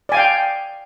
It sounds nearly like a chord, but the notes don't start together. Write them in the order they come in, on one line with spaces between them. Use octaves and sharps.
D5 G#5 F5 G5